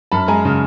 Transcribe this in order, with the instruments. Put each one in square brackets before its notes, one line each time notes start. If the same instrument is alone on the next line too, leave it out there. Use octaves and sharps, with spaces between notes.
[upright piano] F#2 A5 B5
G#3 G#5 A#5
C#3